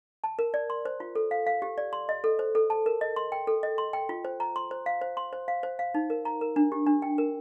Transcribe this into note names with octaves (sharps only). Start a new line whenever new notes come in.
A5
A#4
D5
C6
C5
F4
A4
F5
F5
G4
D5
C6
D#5
A4
C5
A4
A5
A#4
D#5
C6
G5
A4
D#5
C6
G5
F4
C5
A#5
C6
C5
F5
C5
C6
C5
F5
C5
F5
D#4
A#4
A#5
A#4
D4
G4
D4
G5
A#4